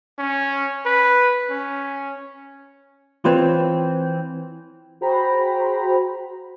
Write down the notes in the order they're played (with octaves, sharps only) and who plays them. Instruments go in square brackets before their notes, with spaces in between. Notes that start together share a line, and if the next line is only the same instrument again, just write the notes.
[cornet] C#4
B4
C#4
[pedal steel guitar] E3 C4 [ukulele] F4 B4 C#5
[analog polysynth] F#4 G#4 C5 G5 A#5 B5